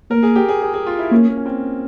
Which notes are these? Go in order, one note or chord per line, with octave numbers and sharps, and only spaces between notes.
A#3 A#4
G#4
G4
G#4
G#4
G#4
F4
E4
A#3 C#4
A#3
C#4
C4